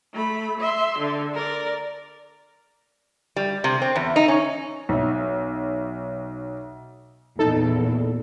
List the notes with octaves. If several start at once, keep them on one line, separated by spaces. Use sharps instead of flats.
A3 B5
E5 C6
D3
A#4 D5
G3
C3
C4
E2
D#4
C#4
B1 E5
E2 A#2 D#4 A4